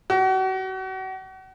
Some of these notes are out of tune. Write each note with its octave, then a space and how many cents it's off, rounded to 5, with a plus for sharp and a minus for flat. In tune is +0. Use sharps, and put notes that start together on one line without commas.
F#4 +35